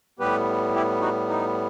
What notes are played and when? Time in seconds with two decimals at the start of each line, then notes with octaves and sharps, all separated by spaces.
0.19 A2 G3 B3 G4 B4
0.74 E4 G4
1.01 D#4 F#4
1.29 D#4